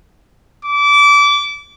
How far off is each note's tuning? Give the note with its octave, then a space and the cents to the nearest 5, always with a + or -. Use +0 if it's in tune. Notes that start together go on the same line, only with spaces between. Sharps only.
D6 -25